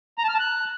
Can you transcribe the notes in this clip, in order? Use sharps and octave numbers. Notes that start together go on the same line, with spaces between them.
A#5
A5
F6
A5
F#6